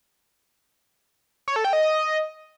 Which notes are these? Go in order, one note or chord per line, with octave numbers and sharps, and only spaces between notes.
C#5
A4
G5
D#5